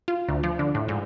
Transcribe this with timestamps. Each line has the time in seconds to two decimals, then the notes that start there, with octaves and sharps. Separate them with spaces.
0.08 F4
0.28 D2
0.43 F3
0.59 D3
0.75 A2
0.89 G#2